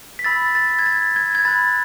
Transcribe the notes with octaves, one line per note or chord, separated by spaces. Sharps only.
B6
B5 E6 A6
A6
G#6
A6
G#6
G#6
B5 F#6 A6